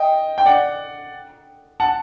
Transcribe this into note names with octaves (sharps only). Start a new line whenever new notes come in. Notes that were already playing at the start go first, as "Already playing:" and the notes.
Already playing: D#5 G5
G5
D5 F#5
F#5 A5